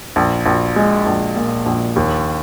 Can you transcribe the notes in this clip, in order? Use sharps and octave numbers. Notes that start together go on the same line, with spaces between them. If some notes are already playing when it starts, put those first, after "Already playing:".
A#1
A#1
G#3
A#1
A#2
A#1
D#2